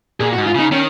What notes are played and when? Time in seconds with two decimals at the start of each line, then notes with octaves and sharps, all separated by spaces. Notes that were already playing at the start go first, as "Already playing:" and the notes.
0.20 A#2 G#4
0.33 F#4
0.38 G#2
0.46 F4
0.55 C#3 D#4
0.72 D#3 C#4